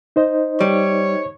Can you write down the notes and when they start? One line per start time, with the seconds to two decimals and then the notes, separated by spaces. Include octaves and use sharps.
0.16 D#4 C5 D#5
0.61 G3 C#5